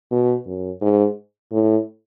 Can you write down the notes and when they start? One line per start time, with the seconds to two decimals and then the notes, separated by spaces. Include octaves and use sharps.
0.11 B2
0.46 F#2
0.81 G#2
1.52 A2